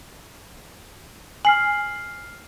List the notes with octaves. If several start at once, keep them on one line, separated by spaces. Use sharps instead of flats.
G#5 F6 C7 F#7